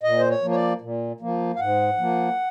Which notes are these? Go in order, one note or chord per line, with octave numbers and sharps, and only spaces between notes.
A#2 D#5
C5
C#5
F3 A#3
C#5
D5
A#2
F3 A#3
F5
G#2 F#5
F3 A#3